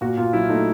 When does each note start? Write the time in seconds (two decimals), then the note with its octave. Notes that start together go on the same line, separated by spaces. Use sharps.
0.01 A#2 F#4
0.17 A#2 F4
0.33 F#3 E4
0.49 A3 D#4